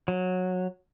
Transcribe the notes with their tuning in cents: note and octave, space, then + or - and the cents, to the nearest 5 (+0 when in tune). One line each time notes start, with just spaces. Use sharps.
F#3 -15